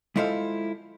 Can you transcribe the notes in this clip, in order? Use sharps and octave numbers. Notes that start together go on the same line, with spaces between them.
G#3 E4 F4 A4 C5 F5